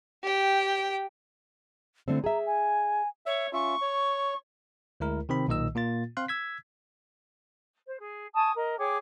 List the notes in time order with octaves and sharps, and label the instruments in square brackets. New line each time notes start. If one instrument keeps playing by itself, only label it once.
[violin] G4 G5
[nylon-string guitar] D3 A3 C4 [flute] E4
[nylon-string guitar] G#4 E5 [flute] A#5
[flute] G#5
[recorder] C#5 [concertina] E5
[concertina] C#4 F4 E5 [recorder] C#6
[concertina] C#5
[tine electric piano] D2 G#3 E4 A#4
C3 D#3 C4 B5
B1 A#2 D#3 D#5 E6
A#2 A#3 F4 A6
C4 F5 C6 F#6
E6 G#6 B6
[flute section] C5
G#4
G#5 A5 C#6 D#6
A#4 D#5
G#4 C#5 G5 D6